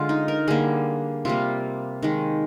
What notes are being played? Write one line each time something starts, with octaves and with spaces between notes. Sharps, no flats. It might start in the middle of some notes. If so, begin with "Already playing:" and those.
Already playing: D3 G#3 F4
D#4
A#4
D3 G3 A#3 G#4
C3 G3 A#3 F4
D#3 G#3